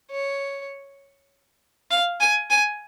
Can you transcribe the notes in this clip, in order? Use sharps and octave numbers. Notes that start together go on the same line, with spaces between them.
C#5
F5
G#5
G#5